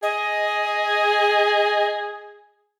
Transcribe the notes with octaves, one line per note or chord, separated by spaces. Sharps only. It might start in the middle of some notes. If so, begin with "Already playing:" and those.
G#4 D#5